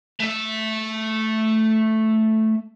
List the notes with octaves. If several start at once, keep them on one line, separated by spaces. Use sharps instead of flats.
A3 E5